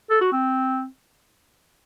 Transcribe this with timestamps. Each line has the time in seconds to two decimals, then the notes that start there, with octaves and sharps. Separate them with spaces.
0.10 A4
0.21 F#4
0.32 C4